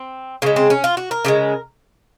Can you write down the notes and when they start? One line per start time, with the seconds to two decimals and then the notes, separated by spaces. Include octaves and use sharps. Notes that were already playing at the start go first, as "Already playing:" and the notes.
Already playing: C4
0.42 C#3 A#3
0.46 G#3
0.56 C4
0.70 C#4
0.84 F4
0.97 F#4
1.11 A#4
1.25 C#3 F3 G#3